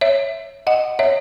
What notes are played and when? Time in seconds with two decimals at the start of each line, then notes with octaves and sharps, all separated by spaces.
0.01 C#5 E5
0.67 D#5 F#5
0.99 C#5 E5